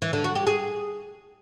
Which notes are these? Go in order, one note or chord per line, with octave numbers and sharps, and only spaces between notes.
E3
D3
F#4
G4
G#4